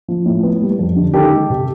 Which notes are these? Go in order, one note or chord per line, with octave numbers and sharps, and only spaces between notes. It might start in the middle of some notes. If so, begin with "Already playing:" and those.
F3
A2
B3
G3
F2
D3
D#3 G4 A4
G#3
C3